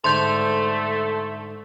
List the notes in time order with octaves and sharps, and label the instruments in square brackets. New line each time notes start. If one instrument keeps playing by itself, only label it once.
[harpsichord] G#2 D3 D4 [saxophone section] A3 A4 [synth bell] C6 G6